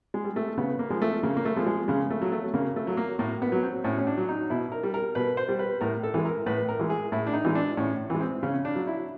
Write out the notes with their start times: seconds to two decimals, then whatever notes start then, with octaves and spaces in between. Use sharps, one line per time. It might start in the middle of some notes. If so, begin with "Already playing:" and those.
0.14 G#3
0.25 G3
0.36 A3
0.57 C#3 B3
0.79 A#3
0.90 F3 G#3
1.02 A3
1.23 C#3 A#3
1.37 A#3
1.45 A3
1.56 F3 G#3
1.67 G#3
1.88 C#3 G#3
2.10 A3
2.21 F#3
2.32 A3
2.54 C#3 A#3
2.76 A3
2.87 F#3
2.97 A#3
3.19 A2 A#3
3.42 B3
3.52 F#3
3.63 C4
3.84 A2 C#4
3.98 C#4
4.07 D4
4.18 F#3
4.29 D#4
4.50 B2 E4
4.72 A#4
4.83 G3
4.94 A#4
5.15 B2 B4
5.37 C5
5.49 G3
5.59 B4
5.81 A2 A#4
6.03 A4
6.14 E3 G#3
6.25 A#4
6.46 A2 B4
6.69 A#4
6.79 E3 G#3
6.90 G#4
7.12 A2 E4
7.27 D4
7.33 D#4
7.44 E3 G#3
7.55 D4
7.77 A2 C#4
8.10 E3 G#3
8.20 C4
8.43 C#3 C#4
8.65 D4
8.75 F#3
8.87 E4